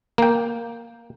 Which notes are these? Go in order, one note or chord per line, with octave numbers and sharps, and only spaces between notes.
A#3 G5